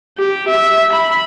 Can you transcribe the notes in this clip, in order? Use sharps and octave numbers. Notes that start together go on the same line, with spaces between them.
G4
E5
B5